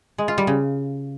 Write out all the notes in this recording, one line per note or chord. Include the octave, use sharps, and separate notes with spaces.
G#3
F4
G3
C#3